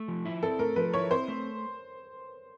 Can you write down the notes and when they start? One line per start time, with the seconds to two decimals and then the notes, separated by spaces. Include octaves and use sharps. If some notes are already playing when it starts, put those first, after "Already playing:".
Already playing: A3
0.08 F3
0.25 E4
0.43 C4 A4
0.59 A3 A#4
0.76 F3 B4
0.93 E4 C#5
1.11 C4 C5
1.28 A3